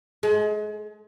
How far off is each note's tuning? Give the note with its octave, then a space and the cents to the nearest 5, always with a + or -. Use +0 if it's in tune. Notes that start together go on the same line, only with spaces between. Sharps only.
G#3 +30